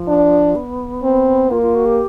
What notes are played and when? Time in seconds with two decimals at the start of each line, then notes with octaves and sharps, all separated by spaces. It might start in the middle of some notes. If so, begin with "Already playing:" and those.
Already playing: F3
0.08 D4
0.56 B3
1.03 C4
1.51 A#3 F4
1.62 F4
1.75 F#4
1.86 G4